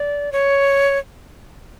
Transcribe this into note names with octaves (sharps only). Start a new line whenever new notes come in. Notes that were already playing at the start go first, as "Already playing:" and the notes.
Already playing: D5
C#5